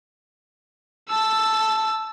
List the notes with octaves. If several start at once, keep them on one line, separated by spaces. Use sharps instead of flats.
A5 E6